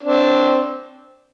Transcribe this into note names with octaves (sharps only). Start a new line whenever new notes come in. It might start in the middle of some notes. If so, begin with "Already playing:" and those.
C4 D4